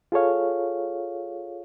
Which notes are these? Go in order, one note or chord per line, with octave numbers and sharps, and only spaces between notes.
F4 G#4 A4 C#5 F5